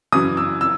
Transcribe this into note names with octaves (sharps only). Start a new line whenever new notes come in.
F#2 C#3 E3 D#6
E6
E6